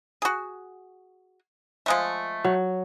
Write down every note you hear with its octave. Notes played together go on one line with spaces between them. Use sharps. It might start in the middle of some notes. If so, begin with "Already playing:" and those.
F#4 G#4
F3 G#3 A3
F#3